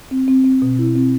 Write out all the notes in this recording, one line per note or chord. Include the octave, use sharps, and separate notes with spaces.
C4
C4
C4
B2
E4
C4